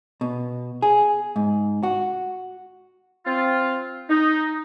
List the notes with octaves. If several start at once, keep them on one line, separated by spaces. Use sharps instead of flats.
B2
G#4
G#2
F#4
C4 F4
D#4